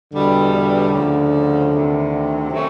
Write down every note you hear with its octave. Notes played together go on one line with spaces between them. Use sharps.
E2 B2 D3 G3
D3
D2 C#3 F3
D2 C3 D#3
C3 D#3 F#3 A3 C#4